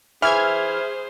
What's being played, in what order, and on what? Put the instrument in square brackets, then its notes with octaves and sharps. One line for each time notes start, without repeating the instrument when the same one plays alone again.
[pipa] E3 [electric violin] G#4 C5 [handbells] E5 [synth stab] F6 G#6